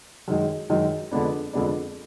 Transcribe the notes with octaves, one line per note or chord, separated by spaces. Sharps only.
F#2 D#3 G#3 D#4
F#2 D#3 G#3 D#4
F2 D3 G#3 B3 D4
F2 D3 G#3 B3 D4